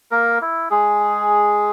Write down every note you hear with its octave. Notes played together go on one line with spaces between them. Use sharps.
A#3 A#4
E4
G#3 G#4